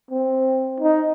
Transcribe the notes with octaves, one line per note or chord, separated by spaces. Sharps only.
C4
D#4